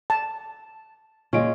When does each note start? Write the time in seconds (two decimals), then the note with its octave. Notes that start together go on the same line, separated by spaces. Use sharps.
0.10 A5
1.33 A#2 G#3 C#4 D7